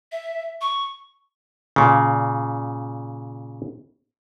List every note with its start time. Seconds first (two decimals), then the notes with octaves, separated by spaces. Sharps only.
0.12 E5
0.61 C#6
1.76 A#2 C#3